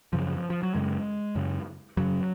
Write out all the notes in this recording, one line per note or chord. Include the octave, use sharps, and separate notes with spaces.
F#2 C#3 F3
F3
F#3
F#2 C#3 G#3
F#2 C#3
F#2 C#3 F#3